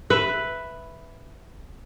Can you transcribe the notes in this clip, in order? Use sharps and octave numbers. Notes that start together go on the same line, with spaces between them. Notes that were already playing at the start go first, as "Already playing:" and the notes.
B4 E5